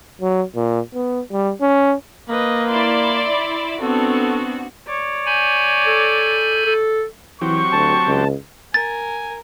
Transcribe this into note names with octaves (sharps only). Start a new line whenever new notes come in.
F#3
A#2
B3
G3
C#4
A#3 B4 D#5
E4 D5 C6
B3 C4 D4 F#4 A4
C#5 D5
G#5 B5 G6
A4
A4
E3 F#3 C4 G4 C#6
D2 A5
C#2
A#4 G#5 A6